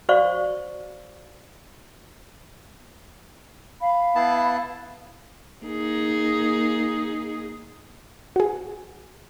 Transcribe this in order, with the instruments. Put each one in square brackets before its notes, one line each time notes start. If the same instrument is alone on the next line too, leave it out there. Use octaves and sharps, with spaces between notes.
[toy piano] F#4 C5 D5 F5 C#6
[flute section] F5 B5
[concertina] B3 E4 A5
[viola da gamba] A#3 D#4 G#4
[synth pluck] F#4 G#4